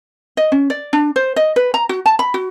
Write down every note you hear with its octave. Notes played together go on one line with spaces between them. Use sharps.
D#5
C#4
D5
D4
C5
D#5
B4
A#5
F#4
A5
B5
F#4